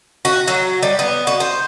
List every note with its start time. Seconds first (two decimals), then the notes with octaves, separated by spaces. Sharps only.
0.25 F#4
0.48 F#3
0.83 G3
0.99 B3
1.27 F#4
1.40 C5